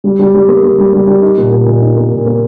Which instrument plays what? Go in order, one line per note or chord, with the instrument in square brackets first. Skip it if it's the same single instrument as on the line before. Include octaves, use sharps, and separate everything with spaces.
[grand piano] G3
G3
G3
A#3
A#3
G3
G3
G3
D#4
A#2
A#2
A#2
D#4
A#3
A#2
A#3